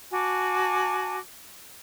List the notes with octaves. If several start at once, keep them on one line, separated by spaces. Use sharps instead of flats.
F#4 G#5 A5 D6